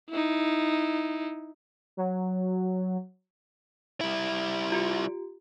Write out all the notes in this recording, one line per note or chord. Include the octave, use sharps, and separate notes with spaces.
D#4 E4
F#3
G3 E4
F4 G4